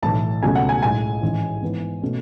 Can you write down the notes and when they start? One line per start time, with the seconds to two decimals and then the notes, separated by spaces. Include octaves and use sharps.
0.02 B1 A2 E3 A5
0.43 C#2 B2 F#3 A3 C#4 G#5
0.55 F#5
0.69 G#5
0.82 B1 A2 G#3 G#5
1.22 A1 G#2 E3 G#3 C#4
1.62 G#2 E3 B3
2.02 B2 A3 C#4